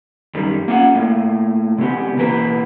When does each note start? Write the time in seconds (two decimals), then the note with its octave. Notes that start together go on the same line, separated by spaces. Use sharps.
0.35 F#2 D#3 G3
0.68 A#3 C#4 F4 F#5
0.95 A2 A#3
1.78 C3 G#3 B3 G4
2.17 B2 E3 A#3 B4 C5